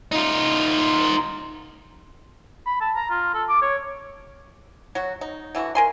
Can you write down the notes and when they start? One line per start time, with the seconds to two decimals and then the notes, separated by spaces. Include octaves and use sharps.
0.12 D#4 F4
2.66 B5
2.81 A5
2.95 A#5
3.10 F4
3.34 A4
3.49 D6
3.62 C#5
4.95 F#3 F#4
5.21 D#4
5.55 D3 E3 F#4
5.75 A#4 G#5 C6